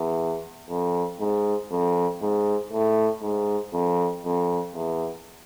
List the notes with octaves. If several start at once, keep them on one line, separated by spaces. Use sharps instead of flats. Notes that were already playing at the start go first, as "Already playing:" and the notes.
Already playing: E2
F2
G#2
F2
G#2
A2
G#2
F2
F2
E2